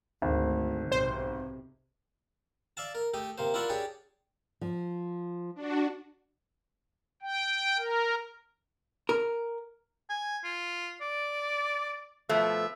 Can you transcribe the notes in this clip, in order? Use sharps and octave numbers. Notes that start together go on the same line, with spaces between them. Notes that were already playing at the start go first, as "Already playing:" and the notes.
G#1 D2
B1 C3 C5
D5 E5 F5 A5
A#4
A3 G4 D#5
C3 A#3 C5
E4 F4 A#4 D5 E5 F#5
D4 G4 G#4 C#5 D5
F3
D4 F#4
G5
A#4
A#4
G#5
F4
D5
B2 F3 A3 E5